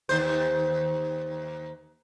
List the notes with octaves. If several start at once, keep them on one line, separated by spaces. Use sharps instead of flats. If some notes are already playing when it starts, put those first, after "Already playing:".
D#2 C5